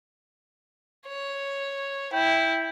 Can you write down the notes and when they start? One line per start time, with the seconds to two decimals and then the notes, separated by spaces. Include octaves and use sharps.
1.08 C#5
2.13 E4 G5